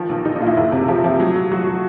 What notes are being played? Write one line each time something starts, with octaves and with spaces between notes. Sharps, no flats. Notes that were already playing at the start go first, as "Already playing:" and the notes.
Already playing: D#3 F3
B1
B1 D#4
D#4
A#2 F4
E4
F#1 E4
C3
F3 G4
F3
F#3
F#3
F#3 F#4
F#3